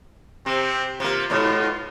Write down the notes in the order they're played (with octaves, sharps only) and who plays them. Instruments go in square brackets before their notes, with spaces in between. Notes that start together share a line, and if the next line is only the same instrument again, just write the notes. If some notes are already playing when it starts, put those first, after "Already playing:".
[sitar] C3 [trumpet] C4
[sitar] C3 A#3 [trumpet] F4
[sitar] G#2 B2